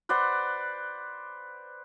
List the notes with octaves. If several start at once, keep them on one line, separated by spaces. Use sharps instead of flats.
B4 C5 D5 F#5